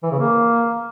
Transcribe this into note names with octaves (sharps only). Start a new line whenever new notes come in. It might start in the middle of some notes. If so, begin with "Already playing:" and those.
E3
C#3
A#3